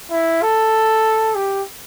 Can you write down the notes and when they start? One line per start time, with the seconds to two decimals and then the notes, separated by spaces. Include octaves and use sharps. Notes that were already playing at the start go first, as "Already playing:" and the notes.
0.11 E4
0.42 A4
1.35 G4